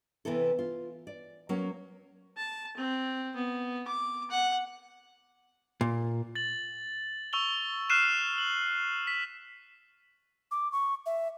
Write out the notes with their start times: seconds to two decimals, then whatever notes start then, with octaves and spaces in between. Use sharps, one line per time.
0.25 C3 E3 B3 E4 A4
0.59 F4
1.07 D5
1.49 F#3 A#3 C#4
2.37 A5
2.77 C4
3.35 B3
3.87 D6
4.31 F#5
5.81 A#2
6.35 A6 F#7
7.33 C#6 E6 F7 G7
7.90 F6 F#6 C7 D#7 E7
8.38 F#7
9.07 B6
10.51 D6
10.72 C#6
11.06 E5